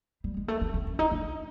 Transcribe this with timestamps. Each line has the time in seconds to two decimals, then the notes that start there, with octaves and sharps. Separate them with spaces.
0.24 G3
0.37 G#3
0.48 A3
0.62 B3
0.74 C4
0.87 C#4
0.99 D#4
1.11 D4